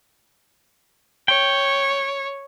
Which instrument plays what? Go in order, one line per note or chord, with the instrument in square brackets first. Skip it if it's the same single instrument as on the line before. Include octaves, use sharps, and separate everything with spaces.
[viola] C#5 [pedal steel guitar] G5